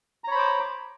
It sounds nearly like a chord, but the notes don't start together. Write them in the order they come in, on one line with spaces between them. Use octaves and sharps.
A#5 C#5 B5 C5 D6